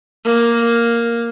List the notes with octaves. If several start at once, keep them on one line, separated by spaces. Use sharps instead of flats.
A#3